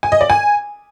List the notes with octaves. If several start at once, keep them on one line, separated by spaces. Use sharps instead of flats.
G#5
D#5
D5
G#5